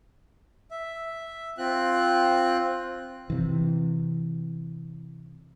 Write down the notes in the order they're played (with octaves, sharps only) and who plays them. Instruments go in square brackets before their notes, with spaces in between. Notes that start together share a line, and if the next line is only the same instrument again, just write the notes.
[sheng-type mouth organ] E5
C4 F4 F#6
[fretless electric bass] C3 E3